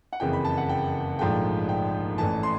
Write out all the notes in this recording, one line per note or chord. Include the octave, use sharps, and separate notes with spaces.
F#5
F#1 F2 C#3 E3 G5
B5
A5
F#5
G5
A#1 G#2 F3 A3 G5
G5
A1 A2 E3 A5
C6